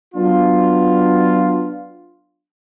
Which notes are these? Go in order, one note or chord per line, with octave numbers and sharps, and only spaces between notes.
F#3 B3 D4 F4